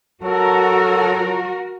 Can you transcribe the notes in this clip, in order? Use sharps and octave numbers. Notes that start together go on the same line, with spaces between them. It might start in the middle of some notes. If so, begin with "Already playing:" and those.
F#3 F#4 A4 A#4